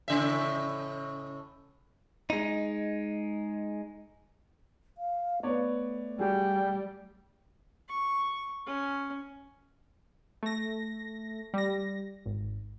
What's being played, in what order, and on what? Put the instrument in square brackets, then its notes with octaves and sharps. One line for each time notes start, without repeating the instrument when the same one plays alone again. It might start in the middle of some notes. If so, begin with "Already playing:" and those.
[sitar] A2 C#3 E5
[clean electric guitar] G#3 D#4
[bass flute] F5
[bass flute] A3 [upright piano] B3 C#5 D5
[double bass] G3 [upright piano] F#4 G#4 [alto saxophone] G5
[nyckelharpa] C#6
C#4
[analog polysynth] A3 A#6
G3 A#6
G#1